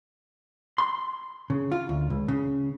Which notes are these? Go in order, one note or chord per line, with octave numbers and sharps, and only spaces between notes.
C6
C#3
F4
D2
C#2
C#3